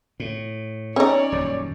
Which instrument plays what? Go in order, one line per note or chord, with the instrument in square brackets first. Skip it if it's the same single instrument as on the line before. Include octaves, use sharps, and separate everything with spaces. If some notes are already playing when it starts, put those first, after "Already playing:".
[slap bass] A2
[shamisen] C#4 D#4 [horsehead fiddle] C#5 D5
[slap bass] D#1 F#2